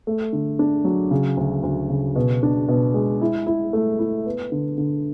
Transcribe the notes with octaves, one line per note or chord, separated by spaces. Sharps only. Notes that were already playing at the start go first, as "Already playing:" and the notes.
A3
D3
D4
F#3
C#3
D2
D2
C#3
B2
D4
B2
G#3
E4
E4
A3
E4
B3
D3
D3